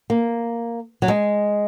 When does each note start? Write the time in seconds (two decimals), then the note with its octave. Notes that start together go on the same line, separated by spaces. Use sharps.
0.10 A#3
1.02 F#3
1.08 G#3